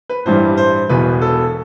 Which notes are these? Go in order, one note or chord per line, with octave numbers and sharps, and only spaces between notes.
B4
A1 G2 E3 G3 C5
C5
E1 E2 B2 B4
A4